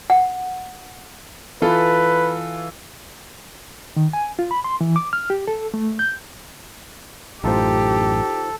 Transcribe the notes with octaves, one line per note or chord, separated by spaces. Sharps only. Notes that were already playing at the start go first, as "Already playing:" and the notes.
F#5
E3 F4 A4 B4
D#3
G#5
F4
B5
C6
E3
D6
F6
G4
A4
A3
G6
A1 F#2 A2 D#4 F4 G4 A4 C5